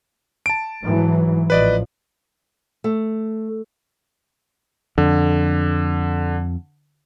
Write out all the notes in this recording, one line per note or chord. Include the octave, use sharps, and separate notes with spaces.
A5 D7
G#2 E3 F#3
A1 F3 B4 D5 D#5
A3
F2 D3